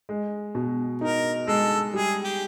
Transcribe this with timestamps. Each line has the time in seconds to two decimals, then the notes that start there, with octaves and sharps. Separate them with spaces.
0.09 G#3
0.55 B2
1.01 D#4 A#4
1.47 G#3 A4
1.94 G3 G#4
2.24 G4